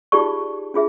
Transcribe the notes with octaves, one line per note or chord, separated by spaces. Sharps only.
D#4 F4 G4 G#4 D5 C#6
D4 F4 G#4 E5